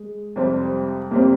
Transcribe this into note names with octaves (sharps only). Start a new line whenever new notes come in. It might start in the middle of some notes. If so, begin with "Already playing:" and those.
Already playing: G#3
F2 C3 G3 C4
F2 C3 G3 A#3 C4